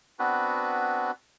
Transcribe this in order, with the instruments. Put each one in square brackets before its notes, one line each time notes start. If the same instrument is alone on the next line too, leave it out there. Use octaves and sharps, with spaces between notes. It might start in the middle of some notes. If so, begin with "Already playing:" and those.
[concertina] B3 C4 D4 F#4 B4